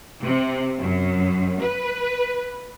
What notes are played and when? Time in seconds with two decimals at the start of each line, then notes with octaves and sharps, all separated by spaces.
0.24 C3
0.79 F#2
1.61 B4